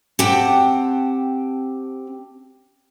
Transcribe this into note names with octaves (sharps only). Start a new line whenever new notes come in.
C4 G4 F#5 G5 A5